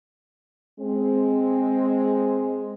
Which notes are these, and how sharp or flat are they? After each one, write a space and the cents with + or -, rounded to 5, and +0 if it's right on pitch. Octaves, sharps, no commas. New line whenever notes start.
G#3 +0 C4 +0